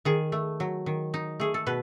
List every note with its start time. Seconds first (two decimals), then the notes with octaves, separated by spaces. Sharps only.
0.05 D#3 G#4
0.32 A3
0.60 F#3
0.86 D#3
1.14 D#4
1.40 A3 G#4
1.54 A4
1.67 B2 B4